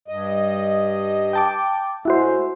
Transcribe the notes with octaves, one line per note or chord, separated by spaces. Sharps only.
G2 D#5
G5 A5 D6
A2 G#3 E4 F#4 C5